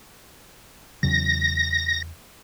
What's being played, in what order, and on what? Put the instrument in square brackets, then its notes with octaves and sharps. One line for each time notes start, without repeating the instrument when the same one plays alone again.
[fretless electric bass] E2 C#3 F#3 [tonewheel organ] A#6